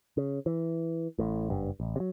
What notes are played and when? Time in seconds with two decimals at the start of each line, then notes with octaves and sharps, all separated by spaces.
0.17 C#3
0.46 E3
1.19 A1 A2
1.50 F#1 G2
1.80 A1
1.96 C3 F#3